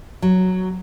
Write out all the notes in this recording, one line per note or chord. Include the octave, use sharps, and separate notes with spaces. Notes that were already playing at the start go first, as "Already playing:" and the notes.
F#3